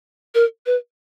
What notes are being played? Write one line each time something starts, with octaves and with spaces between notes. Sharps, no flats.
A#4
B4